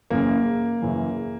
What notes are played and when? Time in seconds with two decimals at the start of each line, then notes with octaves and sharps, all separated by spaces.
0.10 F#2 C#3 E3 A#3
0.82 F#2 C#3 E3